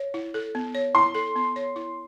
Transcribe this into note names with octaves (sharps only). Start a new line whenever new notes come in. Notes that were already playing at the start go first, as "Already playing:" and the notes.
Already playing: C#5
E4
A4
B3
C#5
E4 C6
A4
B3
C#5
E4